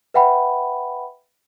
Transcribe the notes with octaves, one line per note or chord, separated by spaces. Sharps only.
B4 E5 F#5 G5 B5